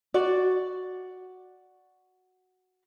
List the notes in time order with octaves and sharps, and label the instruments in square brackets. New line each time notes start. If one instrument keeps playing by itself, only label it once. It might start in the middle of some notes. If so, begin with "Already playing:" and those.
[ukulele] F#4 D5